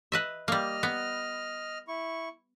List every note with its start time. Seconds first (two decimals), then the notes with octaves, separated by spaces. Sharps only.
0.12 B4 D#5 E5
0.48 G3 A#3 D#5 F6
0.83 B3
1.88 E4 C#6